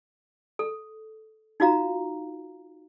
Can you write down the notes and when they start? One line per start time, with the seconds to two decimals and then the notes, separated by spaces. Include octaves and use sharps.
0.59 A4
1.60 D#4 F4 F#4 F5 A#5